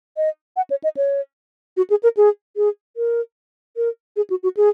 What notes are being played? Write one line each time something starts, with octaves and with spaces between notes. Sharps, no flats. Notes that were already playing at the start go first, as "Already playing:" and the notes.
D#5
F#5
C#5
D#5
C#5
F#4
G#4
A#4
G#4
G#4
A#4
A#4
G#4
F#4
F#4
G#4